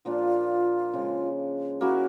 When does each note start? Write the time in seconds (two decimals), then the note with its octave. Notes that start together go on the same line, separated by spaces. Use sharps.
0.05 A#2 F3 A#3 D4 F4
0.93 C#3 F3 G#3
1.81 A#3 C#4 E4 F#4